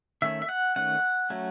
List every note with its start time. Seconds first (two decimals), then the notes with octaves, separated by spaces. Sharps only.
0.22 D#3 A3 C#4 E5
0.42 E5
0.49 F#5
0.76 D#3 A3 C#4 F#5
1.30 F#3 A3 C#4